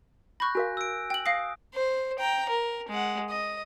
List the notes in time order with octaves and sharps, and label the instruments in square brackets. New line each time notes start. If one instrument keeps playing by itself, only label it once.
[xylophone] B5 C#6 [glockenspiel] F#6 G6 A#6
[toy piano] F#4 A#4 F5 [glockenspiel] G#5
[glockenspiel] E6 D7
[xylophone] G5 F#7
[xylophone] F5 A#6 C7 [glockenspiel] D#6
[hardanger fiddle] C5
G5 A#5
A#4
G#3 F#5
D#5